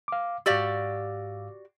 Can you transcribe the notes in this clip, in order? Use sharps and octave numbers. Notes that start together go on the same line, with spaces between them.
F5 D6
G#2 F#4 G4 D5 F5 E6